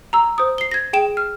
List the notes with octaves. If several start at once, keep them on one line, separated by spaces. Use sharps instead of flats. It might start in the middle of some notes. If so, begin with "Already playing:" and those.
A#5 E6
C5 D#6
C7 G7
G#6 A#6
G#4 G5 E7
F6